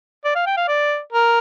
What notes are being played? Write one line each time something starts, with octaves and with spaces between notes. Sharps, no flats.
D5
F5
G5
F5
D5
A#4